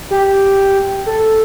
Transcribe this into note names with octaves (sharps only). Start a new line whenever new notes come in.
G4
A4